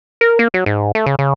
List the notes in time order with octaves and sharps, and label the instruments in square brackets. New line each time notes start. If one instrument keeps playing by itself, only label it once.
[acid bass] A#4
A#3
F#3
G#2
A3
C#3
C#3